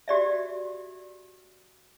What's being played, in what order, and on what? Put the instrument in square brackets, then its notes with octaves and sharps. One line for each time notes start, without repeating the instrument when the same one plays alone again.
[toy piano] F#4 G4 D5 E5